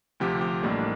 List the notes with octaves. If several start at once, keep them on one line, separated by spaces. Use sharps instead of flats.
D2 C3 F3 G4
G4
A1 A2 G3 A#3 D4